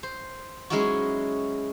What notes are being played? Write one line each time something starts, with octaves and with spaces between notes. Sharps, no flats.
C5
F#3 G#3 C#4 D#4 E4 F#4